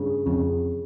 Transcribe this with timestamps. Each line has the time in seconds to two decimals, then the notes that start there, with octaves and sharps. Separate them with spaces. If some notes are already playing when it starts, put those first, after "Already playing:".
Already playing: G2 C#3
0.26 F2 C#3